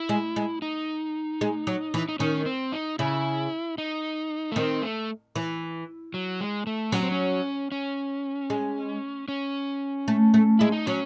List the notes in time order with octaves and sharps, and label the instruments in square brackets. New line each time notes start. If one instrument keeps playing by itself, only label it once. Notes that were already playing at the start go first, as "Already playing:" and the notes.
Already playing: [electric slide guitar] E4
[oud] G#3
G#3
[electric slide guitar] D#4
[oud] G#3
F#3
E3
[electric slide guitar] D#4
[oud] D#3 [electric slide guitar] C#4
[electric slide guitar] C4
D#4
[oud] C#3 [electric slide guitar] E4
[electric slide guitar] D#4
A3
[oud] D#3 [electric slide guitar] C4
[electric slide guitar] A3
[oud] E3
[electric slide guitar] F#3
G#3
A3
[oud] F#3 [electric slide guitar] C#4
[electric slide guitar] C4
C#4
C#4
[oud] G#3
[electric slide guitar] C#4
[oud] A3
A3
[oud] G#3 [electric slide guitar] E4
[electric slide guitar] D#4
[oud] F#3 [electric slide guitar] C#4